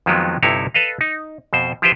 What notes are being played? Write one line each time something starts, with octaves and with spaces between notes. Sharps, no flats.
F2 D#3 F3 F#3 G#3 B3
G1 G2 C3 D#4 E4 C#5
A4 B4 D#5 F5
D#4
F2 B2 C5
F3 E4 F4 G4 B4 C5